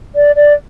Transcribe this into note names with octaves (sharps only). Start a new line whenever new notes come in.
D5
D5